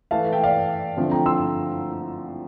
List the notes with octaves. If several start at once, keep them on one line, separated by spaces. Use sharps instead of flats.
E3 A3 E4 F5 A5
E5 G5
D5 F5
D3 F3 A3 C4
G5 A#5
C6 E6